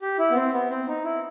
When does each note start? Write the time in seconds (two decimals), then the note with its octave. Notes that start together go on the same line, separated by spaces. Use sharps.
0.02 G4
0.19 E4
0.31 B3
0.35 C4
0.53 B3
0.70 C4
0.88 D#4
1.05 E4